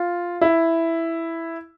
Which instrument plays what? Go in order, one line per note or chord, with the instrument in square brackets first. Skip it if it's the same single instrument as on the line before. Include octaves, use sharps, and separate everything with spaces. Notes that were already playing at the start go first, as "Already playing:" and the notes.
Already playing: [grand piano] F4
E4